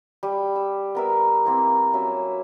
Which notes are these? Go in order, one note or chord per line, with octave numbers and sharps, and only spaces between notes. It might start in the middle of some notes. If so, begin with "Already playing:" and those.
G3
E6
B3 A#4 E5
A#3 C4 E4
F#3 C#4 E5